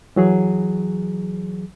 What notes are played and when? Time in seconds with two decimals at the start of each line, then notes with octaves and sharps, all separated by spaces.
0.16 E3 F#3 G#4